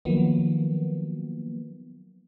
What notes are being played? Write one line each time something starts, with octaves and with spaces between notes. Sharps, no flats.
D#3 F3 F#3 A#3 B3